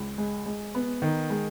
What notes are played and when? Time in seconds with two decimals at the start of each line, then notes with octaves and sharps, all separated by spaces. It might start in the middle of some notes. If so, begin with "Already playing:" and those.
Already playing: C#2
0.18 G#3
0.46 G#3
0.75 B3
1.02 D#3
1.30 G#3